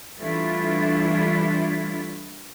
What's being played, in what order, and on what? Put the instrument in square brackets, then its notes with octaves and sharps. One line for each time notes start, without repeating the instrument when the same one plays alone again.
[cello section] E3 G3 A3 D4 E4 F4